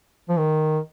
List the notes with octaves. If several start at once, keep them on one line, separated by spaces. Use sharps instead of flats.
F3
D#3